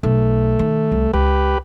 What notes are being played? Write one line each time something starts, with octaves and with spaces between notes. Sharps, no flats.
B1 A3
D#3
C2
C#2 G4 B4